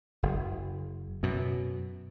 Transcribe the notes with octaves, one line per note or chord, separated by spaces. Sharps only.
F#1
F#2 B2